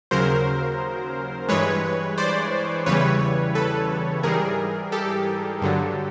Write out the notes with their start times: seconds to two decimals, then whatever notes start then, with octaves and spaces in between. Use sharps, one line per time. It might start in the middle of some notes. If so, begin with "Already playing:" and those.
0.11 D#2 C#3 F#3 A#4 C5
1.49 G2 E3 G#3 B4 C#5
2.18 C5 D5
2.86 E2 C#3 E3 G3 B4 C#5
3.55 A4 B4
4.23 G#2 E3 G3 G#4 A#4
4.92 G4 A4
5.62 G2 D3 F#3